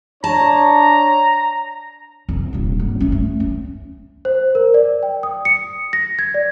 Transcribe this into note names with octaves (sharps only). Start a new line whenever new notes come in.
D4 C#5 A5 A#5
F1
D#1 D4
G2
A3 C#4
A3
C#4
C5
A#4
D5
G5
D#6
C#7
A#6
G#6
D5